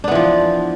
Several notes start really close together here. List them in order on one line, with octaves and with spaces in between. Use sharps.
D4 B3 E3 F3